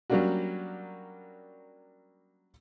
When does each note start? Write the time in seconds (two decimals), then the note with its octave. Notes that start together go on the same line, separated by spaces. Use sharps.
0.10 F#3 G3 A#3 C#4 D4 F#4